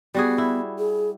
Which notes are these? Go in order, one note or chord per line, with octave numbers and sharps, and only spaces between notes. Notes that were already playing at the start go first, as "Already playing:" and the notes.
G3 B3 F#4 G#4
E4
G#4